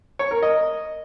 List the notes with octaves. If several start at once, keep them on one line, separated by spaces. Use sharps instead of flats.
C#5
A#4
D#5